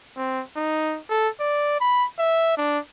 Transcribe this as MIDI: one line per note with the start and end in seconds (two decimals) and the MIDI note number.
0.17 0.42 60
0.56 0.98 63
1.09 1.29 69
1.40 1.77 74
1.81 2.05 83
2.19 2.56 76
2.57 2.79 62